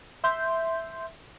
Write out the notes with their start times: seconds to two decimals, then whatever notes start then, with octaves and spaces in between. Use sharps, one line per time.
0.24 E5 C6 G6